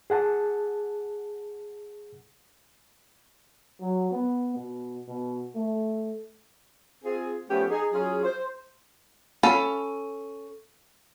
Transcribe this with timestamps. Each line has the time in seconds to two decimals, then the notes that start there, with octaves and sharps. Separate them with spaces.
0.10 G#4 F#5 A5
3.81 F#3
4.12 B3
4.56 B2
5.08 B2
5.55 A3
7.04 C4 F4 G#4
7.50 F3 A3 B3 C#4 G4
7.69 D#4 G#4
7.93 F#3 C#4 F4 G#4
8.24 C5
9.43 C#4 A4 F5 B5